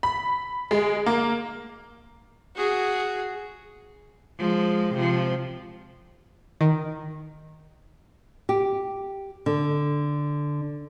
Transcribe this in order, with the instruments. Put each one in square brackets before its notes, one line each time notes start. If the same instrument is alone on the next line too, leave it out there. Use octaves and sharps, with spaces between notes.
[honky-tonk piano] B5
G#3
A#3
[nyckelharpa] F#4 G#4
[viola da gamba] F3 G#3
C3 F3
[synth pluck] D#3
[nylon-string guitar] G4
D3